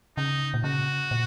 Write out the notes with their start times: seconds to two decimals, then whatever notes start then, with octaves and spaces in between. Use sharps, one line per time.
0.17 C#3 D#4
0.54 A#2
0.64 C#3 F#4
1.11 A#2